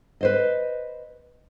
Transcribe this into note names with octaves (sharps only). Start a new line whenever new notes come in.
B4 C5 D#5